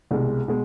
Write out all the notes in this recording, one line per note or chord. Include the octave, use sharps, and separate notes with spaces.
C2 B2 G#3
B2 G#3